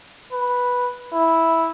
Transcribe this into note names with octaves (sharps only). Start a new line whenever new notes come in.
B4
E4